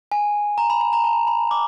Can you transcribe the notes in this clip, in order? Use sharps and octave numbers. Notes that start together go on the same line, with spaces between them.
G#5
A#5
B5
B5
A#5
A5
B5
D6